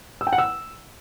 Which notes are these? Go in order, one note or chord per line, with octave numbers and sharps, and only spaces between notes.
E6
G5
F#5
E6